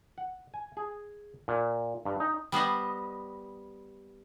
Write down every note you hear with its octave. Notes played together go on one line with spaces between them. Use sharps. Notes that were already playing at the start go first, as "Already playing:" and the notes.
F#5
G#5
G#4
A#2
G2
D#4
G3 B3 C5 D#5